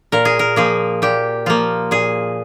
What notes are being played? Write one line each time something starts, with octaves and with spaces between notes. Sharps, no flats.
A#2 A#4
G#4
A#4
F3 A#3 G#4
A#2 G4
F3 A#3 F4
A#2 G#4